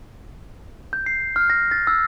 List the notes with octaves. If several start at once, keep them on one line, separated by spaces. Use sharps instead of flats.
G6
C7
F6
A#6
A6
E6